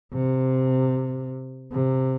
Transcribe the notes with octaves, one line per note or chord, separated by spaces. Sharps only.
C3
C3